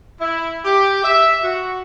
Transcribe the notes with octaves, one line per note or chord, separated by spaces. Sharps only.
E4
G4
E5
F#4